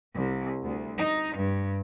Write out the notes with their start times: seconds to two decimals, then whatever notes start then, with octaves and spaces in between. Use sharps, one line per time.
0.15 C2
0.62 D2
0.99 D#4
1.38 G2